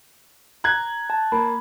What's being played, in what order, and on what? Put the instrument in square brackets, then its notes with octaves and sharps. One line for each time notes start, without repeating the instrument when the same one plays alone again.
[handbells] A#5 [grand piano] F#6 G#6
[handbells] A5
[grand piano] A#3 [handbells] B5